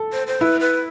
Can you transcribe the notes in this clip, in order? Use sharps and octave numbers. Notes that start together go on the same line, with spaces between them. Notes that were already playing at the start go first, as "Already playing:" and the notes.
Already playing: A4
C5
C5
E4 B4
B4